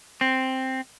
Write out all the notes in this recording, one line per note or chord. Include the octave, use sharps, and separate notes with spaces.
C4